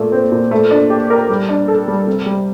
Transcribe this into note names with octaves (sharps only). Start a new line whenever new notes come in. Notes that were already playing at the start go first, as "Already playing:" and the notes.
Already playing: A#2 A3
C4
A#2
A3
D4
G4
A#4
G3
D4
A4
G3
C3
G3